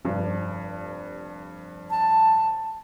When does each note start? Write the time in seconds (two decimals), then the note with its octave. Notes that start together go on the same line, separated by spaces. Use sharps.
0.05 F1 G2
1.90 A5